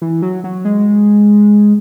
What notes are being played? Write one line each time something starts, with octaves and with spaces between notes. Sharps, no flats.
E3
F#3
F#3
G#3